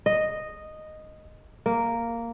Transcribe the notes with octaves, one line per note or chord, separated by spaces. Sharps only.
D#5
A#3